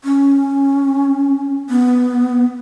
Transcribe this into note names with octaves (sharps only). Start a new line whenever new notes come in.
C#4
B3